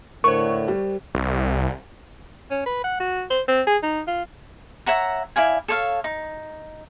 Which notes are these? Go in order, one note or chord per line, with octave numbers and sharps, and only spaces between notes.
A2 D3 A#4 C5 C#6
G3
C2
C#4
B4
F#5
F#4
C5
C4
G#4
D#4
F4
C#5 E5 F#5 A#5
E4 D5 F5 G#5
A4 C#5 F5
D#4